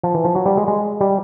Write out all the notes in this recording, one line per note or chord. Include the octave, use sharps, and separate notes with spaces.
F3
E3
F3
F#3
G3
G#3
G#3
G3